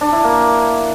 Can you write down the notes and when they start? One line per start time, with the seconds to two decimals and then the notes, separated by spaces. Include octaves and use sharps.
0.01 D4
0.12 E4
0.24 A#3